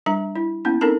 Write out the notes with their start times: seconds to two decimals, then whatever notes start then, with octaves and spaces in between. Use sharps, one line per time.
0.06 G3 D4 A#5
0.35 E4
0.65 A#3 B3 C#4 E4
0.81 C4 D4 D#4 A4 A#4 A5